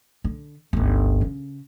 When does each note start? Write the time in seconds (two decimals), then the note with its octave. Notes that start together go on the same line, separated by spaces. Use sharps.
0.24 D3
0.73 G1 C#2
1.21 C#3